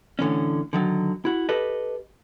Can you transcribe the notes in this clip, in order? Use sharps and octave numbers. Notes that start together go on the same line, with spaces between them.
A2 D3 E3 C#4
D3 D#3 F#3
E4 F#4
G4 A4 B4 D#5